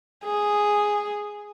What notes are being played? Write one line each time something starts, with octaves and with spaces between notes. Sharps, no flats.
G#4